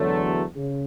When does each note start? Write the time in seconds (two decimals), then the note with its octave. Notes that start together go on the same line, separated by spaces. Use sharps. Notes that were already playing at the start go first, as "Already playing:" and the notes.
Already playing: E2 D3 F#3 A3
0.57 C#3